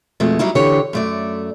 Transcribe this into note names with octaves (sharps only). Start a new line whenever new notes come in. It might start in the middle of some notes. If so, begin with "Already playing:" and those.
F2 B2 G#3 A3
F#3 G3 D#4 E4
D3 E3 G4 C#5
F#2 A3 D5